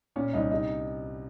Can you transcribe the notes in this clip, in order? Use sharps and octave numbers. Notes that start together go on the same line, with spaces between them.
A#2 C#4
C2 D#4
C3 D#4